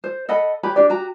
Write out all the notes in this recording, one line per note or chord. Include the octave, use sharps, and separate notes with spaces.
C5
A4 D#5 F#5 B5
G4 B4 C#5 B5
D4 G4 D5
F#4 G4 A#5